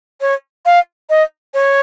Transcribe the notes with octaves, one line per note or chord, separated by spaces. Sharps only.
C#5
F5
D#5
C#5